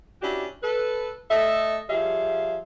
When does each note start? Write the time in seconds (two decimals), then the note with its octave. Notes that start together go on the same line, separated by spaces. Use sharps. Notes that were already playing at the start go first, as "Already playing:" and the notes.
0.22 C#4 D4 E4 F#4 G4
0.63 A4 B4
1.31 A3 A4 D#5 E5
1.90 F3 G3 G#4 E5 F5